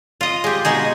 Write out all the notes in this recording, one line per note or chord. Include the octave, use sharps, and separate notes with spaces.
F4 D#5
G#3 G4
B2 G#3 D#4 G#4